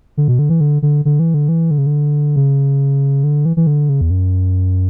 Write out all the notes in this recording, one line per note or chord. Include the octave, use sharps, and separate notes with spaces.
D3
B2
D3
E3
D3
D3
D3
E3
D3
E3
D3
C#3
D3
C#3
D3
E3
E3
D3
C#3
E2
F#2